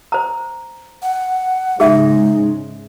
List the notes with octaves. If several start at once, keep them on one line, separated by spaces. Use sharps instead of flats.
C5 A#5
F#5
G#2 C#3 G#3 D#4 G#4 E5